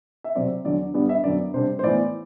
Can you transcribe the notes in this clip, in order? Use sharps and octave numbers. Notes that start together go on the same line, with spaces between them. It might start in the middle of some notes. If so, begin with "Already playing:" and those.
E5
C3 F#3 C4 D5
E2 D3 F#3 D5
G2 D3 G3 B3 D5
E5
F#2 D3 F#3 B3 D5
C3 G3 D4 C5
C5
A2 E3 B3 D5